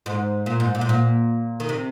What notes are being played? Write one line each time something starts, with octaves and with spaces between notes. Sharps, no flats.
G#2
A#2
G#2
A#2
G#2
A#2
D#3
C3